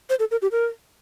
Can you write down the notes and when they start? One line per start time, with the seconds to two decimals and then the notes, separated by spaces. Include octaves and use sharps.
0.10 C5
0.19 A4
0.31 A#4
0.42 G4
0.52 A#4